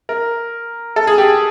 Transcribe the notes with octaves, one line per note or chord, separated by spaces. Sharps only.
A#4
A4
G#4
G4